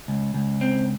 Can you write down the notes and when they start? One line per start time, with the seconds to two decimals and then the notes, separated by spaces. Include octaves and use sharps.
0.08 C#2
0.34 C#2
0.61 C4